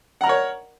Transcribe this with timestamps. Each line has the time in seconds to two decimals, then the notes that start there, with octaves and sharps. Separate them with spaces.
0.21 F#5
0.24 A#5
0.26 A#4
0.29 C#5